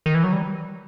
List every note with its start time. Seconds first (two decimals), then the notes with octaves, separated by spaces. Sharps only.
0.06 D#3
0.15 E3
0.24 F#3
0.33 G3